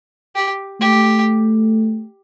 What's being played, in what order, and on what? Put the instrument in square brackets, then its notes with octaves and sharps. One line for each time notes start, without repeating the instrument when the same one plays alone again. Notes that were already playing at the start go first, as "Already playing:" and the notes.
[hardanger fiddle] G4
[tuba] A3 [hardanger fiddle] G4